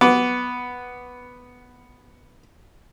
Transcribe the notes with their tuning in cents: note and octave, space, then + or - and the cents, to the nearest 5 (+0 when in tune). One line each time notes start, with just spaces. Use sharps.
B3 +0 D6 -15